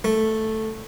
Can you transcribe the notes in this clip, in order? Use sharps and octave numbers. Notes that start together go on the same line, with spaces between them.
A3